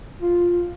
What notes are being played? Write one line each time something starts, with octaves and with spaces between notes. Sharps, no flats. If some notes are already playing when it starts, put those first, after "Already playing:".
F4